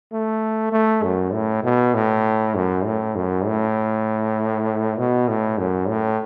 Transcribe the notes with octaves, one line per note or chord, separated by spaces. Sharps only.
A3
A3
F#2
A2
B2
A2
F#2
A2
F#2
A2
B2
A2
F#2
A2